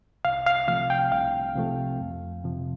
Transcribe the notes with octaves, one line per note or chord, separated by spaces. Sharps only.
C2 F5
F5
C3 F3 A3 F5
G5
C2 F5
C3 F3 A3
F2
C3 F3